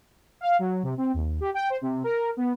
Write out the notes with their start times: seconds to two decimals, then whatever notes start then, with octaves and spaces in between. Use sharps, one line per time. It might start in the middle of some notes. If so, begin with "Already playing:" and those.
0.41 F5
0.59 F#3
0.83 C3
0.97 C4
1.14 D#2
1.41 G4
1.54 G5
1.70 C5
1.81 C3
2.04 A#4
2.37 B3